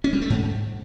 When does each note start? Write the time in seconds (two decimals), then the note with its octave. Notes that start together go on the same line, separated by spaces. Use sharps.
0.04 C#4
0.13 G3
0.21 A3
0.30 G#2